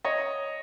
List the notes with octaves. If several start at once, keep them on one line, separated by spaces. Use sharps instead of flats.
C#5 D#5